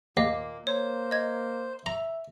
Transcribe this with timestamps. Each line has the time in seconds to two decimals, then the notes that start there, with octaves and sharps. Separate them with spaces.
0.17 D#2 A#2 A#3 D#5 F5 D6
0.67 A#3 C5 C#5
1.11 D#5 G#6
1.86 E5 A#5